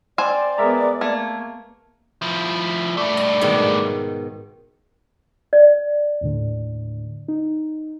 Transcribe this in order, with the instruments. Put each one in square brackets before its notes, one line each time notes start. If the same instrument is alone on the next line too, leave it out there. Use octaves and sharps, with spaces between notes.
[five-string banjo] C4 C5 G#5 [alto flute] D5
[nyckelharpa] G#3 B3 [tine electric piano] A#4 E5 A#5
[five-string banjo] A3 [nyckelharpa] A#3 [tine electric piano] G#6
[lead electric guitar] F3 E4
[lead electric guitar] G2 A3 [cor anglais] D5
[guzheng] D#5
G#2 B2 D#3
[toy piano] D5
[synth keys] D#2 A2 D3
D#4